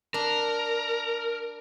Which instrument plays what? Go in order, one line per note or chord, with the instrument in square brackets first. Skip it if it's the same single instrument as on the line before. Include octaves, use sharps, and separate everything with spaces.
[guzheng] D4 [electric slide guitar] A#4